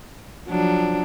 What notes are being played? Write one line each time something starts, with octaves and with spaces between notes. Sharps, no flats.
F3 F#3 D4